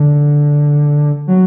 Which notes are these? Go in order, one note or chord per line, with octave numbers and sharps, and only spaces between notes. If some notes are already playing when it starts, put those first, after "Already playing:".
Already playing: D3
F#3